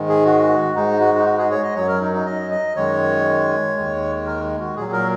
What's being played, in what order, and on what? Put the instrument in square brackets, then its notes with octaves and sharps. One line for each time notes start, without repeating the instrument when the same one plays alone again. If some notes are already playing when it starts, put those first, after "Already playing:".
Already playing: [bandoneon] G#2 D#3 G#3
G#4
F#4
G#2 G#3 D#4
F#4
D#4
F#4
G#4
C#5
D#5
F#2 F#3 C#5
A#4
D#4
D#4
D#5
D#5
F#2 D#3 G#3 C#5
D#2 D#3 G#3
A#4
F#4
A#2 F#3 G#4
A#4